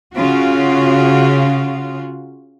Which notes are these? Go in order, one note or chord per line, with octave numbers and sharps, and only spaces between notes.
C#3 F4 F#4